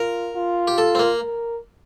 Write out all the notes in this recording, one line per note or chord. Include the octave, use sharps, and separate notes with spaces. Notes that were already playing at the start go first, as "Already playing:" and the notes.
Already playing: F4 A#4
F4
G4
A4
C4
A#3
A#4